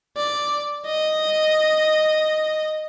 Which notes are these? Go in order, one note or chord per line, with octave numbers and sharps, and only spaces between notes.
D5
D#5